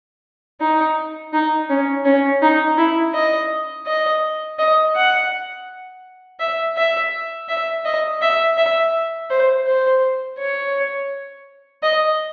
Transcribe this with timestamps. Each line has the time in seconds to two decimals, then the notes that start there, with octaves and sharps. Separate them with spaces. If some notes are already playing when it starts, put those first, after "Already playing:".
0.60 D#4
1.33 D#4
1.69 C#4
2.05 C#4
2.42 D#4
2.78 E4
3.14 D#5
3.86 D#5
4.59 D#5
4.95 F#5
6.40 E5
6.76 E5
7.49 E5
7.85 D#5
8.21 E5
8.57 E5
9.30 C5
9.67 C5
10.38 C#5
11.83 D#5